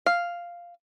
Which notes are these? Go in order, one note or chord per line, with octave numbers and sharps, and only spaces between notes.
F5